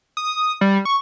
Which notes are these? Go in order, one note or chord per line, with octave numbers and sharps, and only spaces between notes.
D#6
G3
C#6